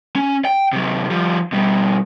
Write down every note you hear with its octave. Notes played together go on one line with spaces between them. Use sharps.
C#4
G5
C3 F#3
F3 G3
B2 G3